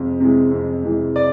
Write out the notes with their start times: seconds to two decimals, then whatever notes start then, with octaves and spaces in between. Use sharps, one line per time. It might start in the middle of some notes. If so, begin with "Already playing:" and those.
Already playing: F2 C3 G#3
0.20 C3 E3 G#3
0.51 F2
0.84 C3 E3 G#3
1.16 D5